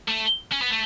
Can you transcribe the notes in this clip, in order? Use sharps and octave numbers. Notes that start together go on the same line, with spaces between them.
A3
C#4
B3
A3